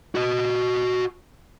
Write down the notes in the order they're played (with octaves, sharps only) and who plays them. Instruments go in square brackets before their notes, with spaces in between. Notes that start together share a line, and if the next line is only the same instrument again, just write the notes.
[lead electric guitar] F#4 D#5